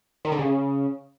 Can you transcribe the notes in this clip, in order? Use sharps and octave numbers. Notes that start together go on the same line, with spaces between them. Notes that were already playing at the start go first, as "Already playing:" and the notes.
D#3
D3
C#3